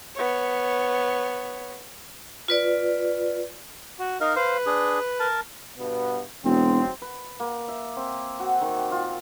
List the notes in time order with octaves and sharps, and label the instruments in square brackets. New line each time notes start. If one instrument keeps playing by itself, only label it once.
[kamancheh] B3 C#5
[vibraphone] F4 B4 D5
[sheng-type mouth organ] F#4
[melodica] D#4 A#4 [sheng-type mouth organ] D#5 F5
[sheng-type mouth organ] B4 [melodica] C5 F5
[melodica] D4 G#4
A#4 A5
[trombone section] G2 B2 B3
[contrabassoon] E1 [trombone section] G#2 F#3 C4
[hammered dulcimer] B4
A#3
E5
C4
F#4
D#3
F4